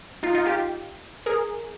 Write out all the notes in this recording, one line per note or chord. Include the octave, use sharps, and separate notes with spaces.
D#4 F4
D#4 F4
F4 G4
G#4 A#4